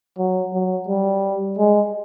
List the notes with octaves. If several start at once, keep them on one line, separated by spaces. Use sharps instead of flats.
F#3
F#3
G3
G#3